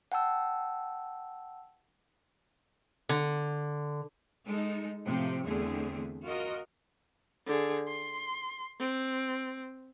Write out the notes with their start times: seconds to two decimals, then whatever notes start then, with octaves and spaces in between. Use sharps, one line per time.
0.12 F#5 G5 A5 E6
3.09 D3
4.47 G#3 D#4 A4
5.08 A2 C3 F3 C4
5.44 E2 D3 A3 C4 G#4
6.26 F4 F#4 A#4 D#5
7.47 D3 G#4
7.88 C6
8.80 C4